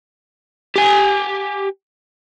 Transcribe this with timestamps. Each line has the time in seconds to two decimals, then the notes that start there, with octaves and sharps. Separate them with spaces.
0.76 G4 G#5